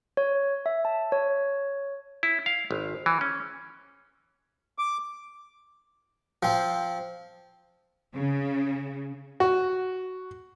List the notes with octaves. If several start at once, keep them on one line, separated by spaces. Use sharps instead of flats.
C#5
E5
A5
C#5
E4
F5
G#1
E3
C#4
D6
F3 C4
C#3
F#4